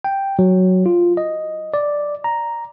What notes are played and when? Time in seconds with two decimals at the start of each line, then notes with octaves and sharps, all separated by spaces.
0.04 G5
0.39 F#3
0.86 F4
1.17 D#5
1.74 D5
2.24 A#5